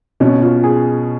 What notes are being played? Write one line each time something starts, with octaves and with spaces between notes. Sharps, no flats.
B2 C#4
F4
G#4